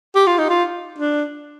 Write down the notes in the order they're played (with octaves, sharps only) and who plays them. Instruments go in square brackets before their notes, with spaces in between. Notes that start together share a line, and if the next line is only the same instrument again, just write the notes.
[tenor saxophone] G4
F4
D#4
F4
D4